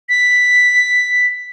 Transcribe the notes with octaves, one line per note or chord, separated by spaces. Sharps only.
B6